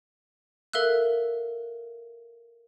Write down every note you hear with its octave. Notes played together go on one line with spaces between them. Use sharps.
A4 A#4 E5 F5 E6 F#6